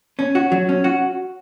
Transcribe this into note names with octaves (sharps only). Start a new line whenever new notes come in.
C#4
F#4
F#3
C#4
F#4